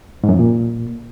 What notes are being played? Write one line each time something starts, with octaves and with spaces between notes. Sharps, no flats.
G#2
F#2
F2
A#2